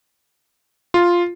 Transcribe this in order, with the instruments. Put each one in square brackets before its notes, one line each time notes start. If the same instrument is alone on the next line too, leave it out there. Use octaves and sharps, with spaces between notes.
[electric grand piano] F4